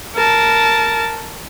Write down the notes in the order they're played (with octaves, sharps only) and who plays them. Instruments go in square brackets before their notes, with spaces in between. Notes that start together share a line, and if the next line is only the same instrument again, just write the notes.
[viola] A#4 A5